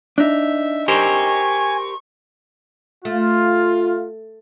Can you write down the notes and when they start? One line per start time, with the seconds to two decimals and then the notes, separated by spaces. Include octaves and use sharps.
0.18 D4 D#4 E5
0.88 G4 A#4 C5 G#5 C#6
3.05 A3 F4